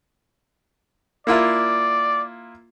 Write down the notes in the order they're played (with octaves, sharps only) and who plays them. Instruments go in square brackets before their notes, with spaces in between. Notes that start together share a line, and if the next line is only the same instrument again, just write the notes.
[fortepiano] A#3 E4 F4 [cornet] D5